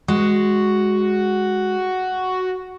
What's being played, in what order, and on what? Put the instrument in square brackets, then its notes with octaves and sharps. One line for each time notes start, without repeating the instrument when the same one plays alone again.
[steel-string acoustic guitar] G#3 [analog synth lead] F#4